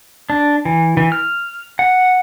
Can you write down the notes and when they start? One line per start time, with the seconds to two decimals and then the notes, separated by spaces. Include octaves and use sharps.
0.30 D4
0.65 E3
0.97 E3
1.12 F6
1.79 F#5